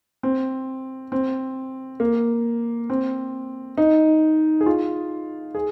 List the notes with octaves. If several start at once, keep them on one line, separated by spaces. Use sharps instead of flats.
C4
C4
A#3
C4
D#4
G#4
F4
G#4